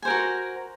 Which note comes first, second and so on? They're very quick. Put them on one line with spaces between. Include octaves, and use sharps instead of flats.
G#5 C5 A#4 F#4